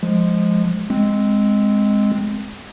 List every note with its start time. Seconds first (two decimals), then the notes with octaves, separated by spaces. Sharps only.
0.03 F3 G#3
0.90 G#3 C4